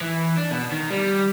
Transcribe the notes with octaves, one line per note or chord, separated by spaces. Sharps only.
E3
D4
B2
D#3
G3